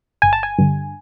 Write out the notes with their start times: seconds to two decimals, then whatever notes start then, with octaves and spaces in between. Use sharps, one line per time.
0.22 G1 G#5
0.33 A5
0.43 G#5
0.59 G2 D3